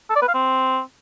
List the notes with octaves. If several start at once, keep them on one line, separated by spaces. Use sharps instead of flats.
A4
D5
B4
F5
C4